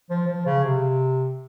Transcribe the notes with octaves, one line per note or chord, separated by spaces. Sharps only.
F3
F3
C#3
C3